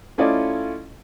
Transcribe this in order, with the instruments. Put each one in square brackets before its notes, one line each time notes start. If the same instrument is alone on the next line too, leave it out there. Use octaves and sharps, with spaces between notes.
[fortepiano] A3 C#4 E4 F4 D5 D#5